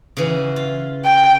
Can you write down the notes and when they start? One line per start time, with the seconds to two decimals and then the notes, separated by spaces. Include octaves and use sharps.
0.17 C#3 E3 F#4
0.56 F4
1.05 G5